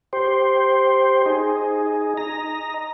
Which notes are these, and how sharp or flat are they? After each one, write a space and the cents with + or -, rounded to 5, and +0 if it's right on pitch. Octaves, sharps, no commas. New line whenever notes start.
G4 +0 C5 +5
D#4 +0 G#4 +5
D#5 +0 A#5 +0